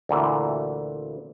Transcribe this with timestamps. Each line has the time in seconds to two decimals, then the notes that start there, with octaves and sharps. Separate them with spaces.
0.09 D2 A#2 E3